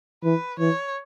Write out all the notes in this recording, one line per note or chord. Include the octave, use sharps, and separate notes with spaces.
E3 B4
E3 C#5